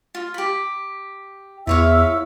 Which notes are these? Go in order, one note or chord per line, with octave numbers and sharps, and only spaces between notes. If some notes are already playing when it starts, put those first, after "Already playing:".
F4
G4 B5
E2 E4 B4 C#5 E5 F5 E6